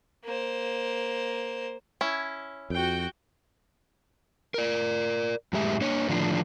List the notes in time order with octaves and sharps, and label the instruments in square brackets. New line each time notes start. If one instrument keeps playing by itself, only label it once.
[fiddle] A#3 C5
[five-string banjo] C#4 E4
[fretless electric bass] F2 [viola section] F#4 G5
[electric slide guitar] A#4 D5
F#2 A2 G#3 G4 E5
A#3 D4 C#5
A2 D3 D#3 F3 D4 F4